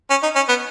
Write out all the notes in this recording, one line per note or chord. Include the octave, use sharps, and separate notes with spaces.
C#4
D#4
C#4
B3